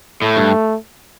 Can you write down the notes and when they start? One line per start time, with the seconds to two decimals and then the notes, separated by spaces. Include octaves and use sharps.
0.22 A2 A3
0.37 G2